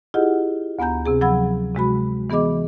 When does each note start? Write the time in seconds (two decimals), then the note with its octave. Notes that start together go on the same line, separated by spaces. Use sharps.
0.14 E4 F4 G4 G#4 D#5 F#5
0.79 D2 B3 G#5 A#5 G6
1.06 C3 C4 G#4
1.21 F3 F#3 F#5 B5 E6 G#6
1.75 C3 G#3 F#4 B5
2.30 E3 B3 G#4 D#5 D6